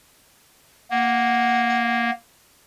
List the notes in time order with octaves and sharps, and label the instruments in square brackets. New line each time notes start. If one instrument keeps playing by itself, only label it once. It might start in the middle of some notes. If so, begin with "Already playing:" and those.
[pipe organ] A#3 [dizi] F#5